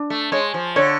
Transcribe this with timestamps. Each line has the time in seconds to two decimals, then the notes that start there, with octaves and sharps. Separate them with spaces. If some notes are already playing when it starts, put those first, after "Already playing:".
Already playing: D4
0.10 A3
0.32 G#3 C#5
0.54 F3
0.76 D3 C#5